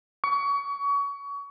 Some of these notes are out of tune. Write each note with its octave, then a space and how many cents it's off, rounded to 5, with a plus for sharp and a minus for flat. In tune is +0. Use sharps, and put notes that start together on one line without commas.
C#6 +30